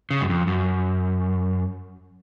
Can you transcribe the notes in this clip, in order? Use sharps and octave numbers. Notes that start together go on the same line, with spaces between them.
C#3
F#2
F2
F#2